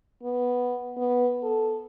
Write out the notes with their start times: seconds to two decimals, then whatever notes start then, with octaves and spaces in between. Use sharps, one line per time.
0.22 B3
0.97 B3
1.43 A4